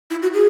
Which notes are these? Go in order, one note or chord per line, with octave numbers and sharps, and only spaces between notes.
E4
F#4
G#4